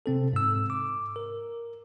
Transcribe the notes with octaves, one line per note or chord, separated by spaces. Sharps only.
C3 C4 A4
G#2 E6
D6
A#4